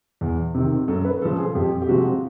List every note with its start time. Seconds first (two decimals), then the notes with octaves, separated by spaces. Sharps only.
0.21 E2
0.55 C3 D#3
0.88 F#2 A4
1.05 B4
1.22 C#3 F3 A4
1.38 G#4
1.55 F2 G4
1.82 G4
1.89 C3 F3 G#3 F#4